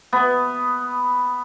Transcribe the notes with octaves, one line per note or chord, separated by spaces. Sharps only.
B3